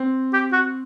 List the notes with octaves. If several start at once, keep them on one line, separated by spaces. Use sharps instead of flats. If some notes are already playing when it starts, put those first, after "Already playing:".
Already playing: C4
G4
F#4